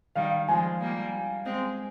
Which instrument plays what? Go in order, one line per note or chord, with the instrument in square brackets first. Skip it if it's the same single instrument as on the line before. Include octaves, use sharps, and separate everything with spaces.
[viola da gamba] D#3 G3 [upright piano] F5
[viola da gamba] F3 G#3 [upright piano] G#5
[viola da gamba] G3 A#3
G#3 C4